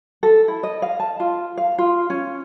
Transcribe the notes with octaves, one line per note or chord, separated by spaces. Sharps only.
A4
E4
D#5
F5
A5
F4
F5
F4
C#4